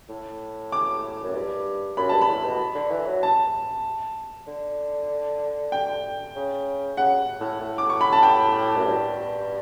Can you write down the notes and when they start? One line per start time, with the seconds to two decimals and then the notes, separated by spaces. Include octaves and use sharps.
0.09 A2
0.72 D6
1.23 F#2
1.35 G2
1.97 F#2 B5
2.09 G2 A5
2.22 B5
2.29 A2
2.44 B2
2.75 D3
2.91 E3
3.06 F#3
3.23 A5
4.47 D3
5.72 G5
6.36 C#3
6.97 C#3 F#5
7.40 A2
7.61 A2
7.78 D6
7.90 C#6
8.01 B5
8.13 A5
8.23 G5
8.76 F#2
8.86 G2